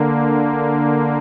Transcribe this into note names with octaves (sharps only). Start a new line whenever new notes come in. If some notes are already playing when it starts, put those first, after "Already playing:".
Already playing: D3 A#3